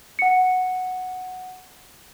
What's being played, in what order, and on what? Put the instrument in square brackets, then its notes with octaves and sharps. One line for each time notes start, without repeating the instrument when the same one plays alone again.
[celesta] F#5 C#7